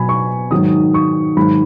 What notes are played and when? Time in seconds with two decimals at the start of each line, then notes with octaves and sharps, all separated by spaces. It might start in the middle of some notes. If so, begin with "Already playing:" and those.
Already playing: B2 F#3 G#5 B5
0.09 C#6
0.51 G#2 D#3 F#3 D#6
0.94 C#6
1.36 G#2 D#3 F#3 B5